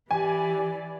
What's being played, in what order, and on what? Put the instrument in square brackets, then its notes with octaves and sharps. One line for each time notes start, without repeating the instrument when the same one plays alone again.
[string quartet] E3 D5 [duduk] G4 [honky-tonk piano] G#5